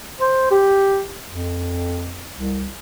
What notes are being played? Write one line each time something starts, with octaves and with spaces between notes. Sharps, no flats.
C5
G4
F2
C2